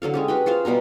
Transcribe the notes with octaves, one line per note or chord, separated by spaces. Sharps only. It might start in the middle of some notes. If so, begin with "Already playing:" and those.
D3 F#3 A4 F5
G#3 C#4 G4
F#4 B4 G5
F4 G#4 C5 F5
B2 G3 B3 A#5